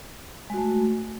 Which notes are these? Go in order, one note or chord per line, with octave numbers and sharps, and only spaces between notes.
G#3 A3 F#4